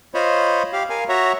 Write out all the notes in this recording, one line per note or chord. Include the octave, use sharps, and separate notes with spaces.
F4 C5 C#5 D#5 B5
G4 F5
A#4 F5 G#5
F#4 C#5 E5 A#5